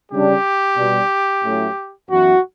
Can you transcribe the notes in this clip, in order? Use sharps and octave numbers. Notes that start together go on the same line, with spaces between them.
C#3 G3 D4 G4
B2 G3 D4
A2 F#3 A3 C#4 E4
F#2 E3 B3 E4 F#4